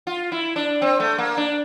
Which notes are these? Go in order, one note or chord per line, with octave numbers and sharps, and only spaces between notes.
F4
E4
D4
C4
A3
A#3
D4